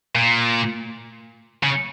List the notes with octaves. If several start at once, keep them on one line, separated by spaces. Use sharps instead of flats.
A#2
C#3